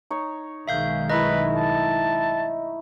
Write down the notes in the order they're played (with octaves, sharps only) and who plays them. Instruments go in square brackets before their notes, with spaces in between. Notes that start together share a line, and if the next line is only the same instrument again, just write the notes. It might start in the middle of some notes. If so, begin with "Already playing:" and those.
[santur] D#4 C#5
[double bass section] B1 D#3 G#3 [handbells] E5 F5 G6
[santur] A3 D#4 E4 [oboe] B4 [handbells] D#5
[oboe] A5